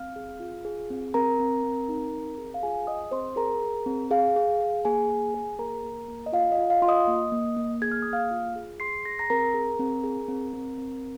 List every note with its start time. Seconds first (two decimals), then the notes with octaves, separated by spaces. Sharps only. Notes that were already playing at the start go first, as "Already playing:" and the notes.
Already playing: C4 F5 F6
0.16 G#4
0.40 F4
0.65 G#4
0.90 C4
1.14 C4 A#4 A#5
1.40 C4
1.63 C4
1.89 D#4
2.13 C4
2.38 G#4
2.54 F5
2.62 F4 G#4 G#5
2.87 G#4 D#5 D#6
3.11 C4 C5 C6
3.36 G#4 A#4 A#5
3.62 G#4
3.86 C4
4.11 G#4 F5
4.36 G#4
4.61 G#4
4.85 A#3 G#4 G#5
5.10 G#4
5.34 G#4
5.59 A#3 A#4 A#5
5.84 A#3
6.08 A#3
6.26 D#5
6.33 F4 F5
6.52 D#5
6.58 F4
6.70 F5
6.82 F4 C6
6.88 D#5 D#6
7.07 A#3
7.32 A#3
7.57 A#3
7.82 G#4 G#6
7.91 F6
8.02 A#3 D#6
8.13 F5 F6
8.31 F4
8.56 G#4
8.80 G#4 C6 C7
9.05 G#4 A#6
9.12 C7
9.19 A#5 A#6
9.30 C4 A#4 A#5
9.54 G#4
9.79 C4
10.04 G#4
10.28 C4
10.53 C4
10.78 C4